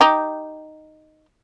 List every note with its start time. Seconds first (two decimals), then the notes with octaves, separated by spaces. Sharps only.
0.01 D#4 G4